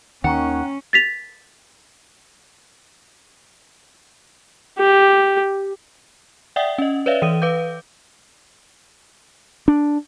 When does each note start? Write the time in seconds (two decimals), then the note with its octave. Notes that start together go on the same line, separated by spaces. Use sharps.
0.24 D#2 D#3 C#4 F#5 G5 A#5 C#6
0.93 A6 B6 F7
4.78 G4
6.56 D5 E5 F#5 G5 D#6
6.78 C#4 D#5
7.06 B4 C#5 D5 E5 F5
7.22 E3 D#6 D#7
7.42 B4 F5 D6 G6
9.68 D4